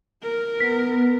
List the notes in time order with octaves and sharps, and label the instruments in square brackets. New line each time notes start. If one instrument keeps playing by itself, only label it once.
[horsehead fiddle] A#4
[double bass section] B3 [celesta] B6